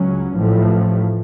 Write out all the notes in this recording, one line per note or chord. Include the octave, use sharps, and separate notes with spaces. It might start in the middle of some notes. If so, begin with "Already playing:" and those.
Already playing: C#2 C#3 F#3 C#4
A1 A2 F3 A3